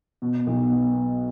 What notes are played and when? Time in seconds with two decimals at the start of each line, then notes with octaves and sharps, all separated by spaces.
0.22 B2
0.47 B1
0.73 B3